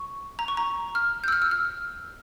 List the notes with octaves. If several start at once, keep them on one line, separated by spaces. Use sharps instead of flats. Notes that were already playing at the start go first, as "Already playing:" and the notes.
Already playing: C#6
A#5
C#6
A#5
F6
G6
E6
F6
E6
F6